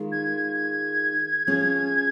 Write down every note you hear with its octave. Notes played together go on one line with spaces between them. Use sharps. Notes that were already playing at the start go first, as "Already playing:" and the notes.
Already playing: D#3 G#3 F4
G#6
G#6
F3 C#4 G#4 C#5